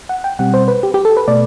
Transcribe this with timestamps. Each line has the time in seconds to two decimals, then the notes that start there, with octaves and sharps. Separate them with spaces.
0.09 F#5
0.24 G5
0.39 B2 G3 C4 F#5
0.54 C5
0.68 B4
0.83 G4
0.94 G4
1.05 A4
1.17 B4
1.28 B2 A3 D5